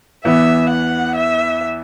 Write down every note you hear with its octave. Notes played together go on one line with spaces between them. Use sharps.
E2 E3 B3 E5
F#5
E5